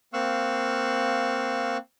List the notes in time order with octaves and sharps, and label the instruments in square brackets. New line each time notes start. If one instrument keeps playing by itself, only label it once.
[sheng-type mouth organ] A#3 C4 F5 C#6 E6 F#6